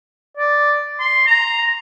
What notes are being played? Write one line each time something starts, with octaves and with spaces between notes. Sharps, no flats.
D5
C6
A#5